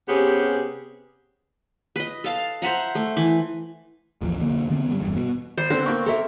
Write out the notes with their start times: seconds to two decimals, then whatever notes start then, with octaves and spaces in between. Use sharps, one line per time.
0.08 C3 B3 C#4 G4 G#4
1.96 B4 D#5
2.24 A4 F5 A5
2.62 C5 E5 F#5 A#5
2.95 A3
3.17 E3
4.21 D1 A1 D#2 F3
4.41 B1 F2 D3 A#3
4.70 D3 B3 C4
4.88 F#2 G3
5.00 F1 E2 G2
5.16 B2
5.57 G#1 C5
5.70 D3 B3 C4
5.86 A#3 C#6
6.06 A4 A#4 E5